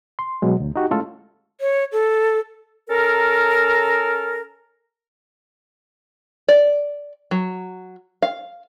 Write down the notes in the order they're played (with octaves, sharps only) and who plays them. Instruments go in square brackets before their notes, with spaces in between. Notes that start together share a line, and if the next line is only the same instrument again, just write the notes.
[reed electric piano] C6
B2 F#3 G#3
D2
D#4 F#4 G4
G#3 A3 C#4 E4 F4 A4
[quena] C#5
A4
[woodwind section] C#4 A4 A#4
[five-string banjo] D5
F#3
F5